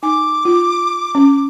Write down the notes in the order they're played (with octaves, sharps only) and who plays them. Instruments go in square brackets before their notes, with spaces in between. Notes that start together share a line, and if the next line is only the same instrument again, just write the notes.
[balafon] D#4 G#5 [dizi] D6
[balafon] F4
C#4